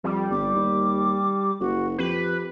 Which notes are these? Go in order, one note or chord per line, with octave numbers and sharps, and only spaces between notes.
F2 G3
G1 D6
D#2
F#1 F#4
F2 G4 B4